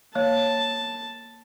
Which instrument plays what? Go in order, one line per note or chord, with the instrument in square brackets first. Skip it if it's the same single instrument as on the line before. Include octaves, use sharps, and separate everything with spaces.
[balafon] A#3 C#5 [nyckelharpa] A5